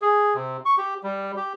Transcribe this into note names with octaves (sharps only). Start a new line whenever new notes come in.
G#4
C3
C#6
G4
G3
G4